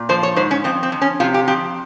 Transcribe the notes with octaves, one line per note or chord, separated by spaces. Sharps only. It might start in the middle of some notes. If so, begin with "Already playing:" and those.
Already playing: A#2
F3 C5
C#5
G#2 C5
C#4
F2 C4
C4
F2
C#4
C3 F4
G4
F2 G4